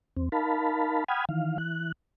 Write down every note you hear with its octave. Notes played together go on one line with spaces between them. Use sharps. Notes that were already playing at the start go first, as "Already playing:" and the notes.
E2 C4
D#4 A#4 F5 A5 B5
F#5 G5 B5 D#6 F6 G#6
D#3 E3 F5
E3 F#6